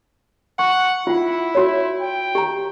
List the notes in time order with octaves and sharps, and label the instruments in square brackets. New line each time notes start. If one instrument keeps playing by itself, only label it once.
[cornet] F#5 [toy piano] C#6
[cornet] E4 [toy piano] F4 F#5
[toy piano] F#4 C#5
[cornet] G5
[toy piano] G4 A#5